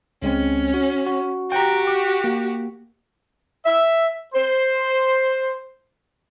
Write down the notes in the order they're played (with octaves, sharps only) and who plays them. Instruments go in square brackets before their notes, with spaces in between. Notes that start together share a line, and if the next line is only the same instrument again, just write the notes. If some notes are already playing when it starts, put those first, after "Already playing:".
[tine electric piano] C#2 G#3 C4 [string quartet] C#4
[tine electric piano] F#4
F#4
[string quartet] F#4 G4 [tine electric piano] G5 A#5
[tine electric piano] D6
A#3
[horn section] E5
C5